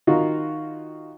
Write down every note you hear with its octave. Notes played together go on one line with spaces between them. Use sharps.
D#3 D#4 F4 F#4